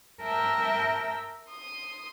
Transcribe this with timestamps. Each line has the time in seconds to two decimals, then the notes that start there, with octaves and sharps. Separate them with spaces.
0.22 A#4 E5 G5 A5
1.49 C6 D#6